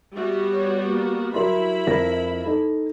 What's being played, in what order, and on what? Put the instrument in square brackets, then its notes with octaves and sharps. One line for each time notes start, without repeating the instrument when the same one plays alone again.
[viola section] G3 B3 F#4 [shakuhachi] E5
[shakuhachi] C#5
A#3
[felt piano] F#3 A#4 C6 [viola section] E4 B5 [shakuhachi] E5
[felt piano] F2 A#4 A#6
D#4 A4